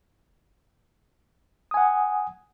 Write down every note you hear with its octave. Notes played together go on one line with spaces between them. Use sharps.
F#5 G#5 D#6